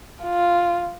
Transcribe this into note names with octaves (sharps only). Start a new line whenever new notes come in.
F4